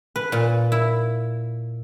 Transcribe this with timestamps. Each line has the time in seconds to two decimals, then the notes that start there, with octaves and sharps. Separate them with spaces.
0.16 B4
0.32 A#2
0.72 E4